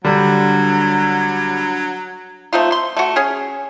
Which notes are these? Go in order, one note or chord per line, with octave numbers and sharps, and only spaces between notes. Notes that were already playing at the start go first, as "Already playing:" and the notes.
D3 F#3 G3 D4
A3 C4 D#4 F4
C6
A3 F#4
C#4 G#4